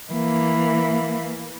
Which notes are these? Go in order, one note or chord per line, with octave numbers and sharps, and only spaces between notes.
E3 A#3